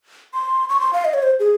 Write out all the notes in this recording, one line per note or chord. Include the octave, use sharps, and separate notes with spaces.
C6
C#6
C6
F5
D#5
C#5
C5
G#4